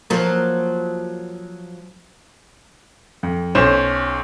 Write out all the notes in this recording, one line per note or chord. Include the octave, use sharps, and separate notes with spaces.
F3 F#3 A#3
F2
B1 C#4 C5 E7